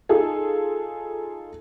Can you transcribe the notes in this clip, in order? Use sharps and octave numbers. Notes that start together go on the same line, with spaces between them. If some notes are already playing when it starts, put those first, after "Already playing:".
D#4 F4 G#4 A4